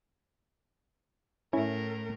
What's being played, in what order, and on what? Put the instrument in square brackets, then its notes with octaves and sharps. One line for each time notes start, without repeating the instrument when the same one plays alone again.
[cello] A2 A#4 [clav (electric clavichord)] C#4 [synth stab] E4